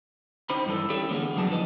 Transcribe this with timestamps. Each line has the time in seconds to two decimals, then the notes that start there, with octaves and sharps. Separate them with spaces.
0.50 D#4 C5 B5
0.66 G2 D#3 E3 A4
0.89 E4 G4 A4 C#5 E5
1.09 D3 E3 A#3 B3 G#4
1.36 C#2 G#2 F#3 G#4 A5
1.49 F3 E4 B4 D#5